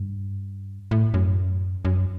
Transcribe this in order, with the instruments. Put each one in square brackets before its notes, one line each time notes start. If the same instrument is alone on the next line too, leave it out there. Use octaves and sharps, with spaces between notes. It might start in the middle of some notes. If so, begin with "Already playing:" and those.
Already playing: [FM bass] G2
A2
F#2
F#2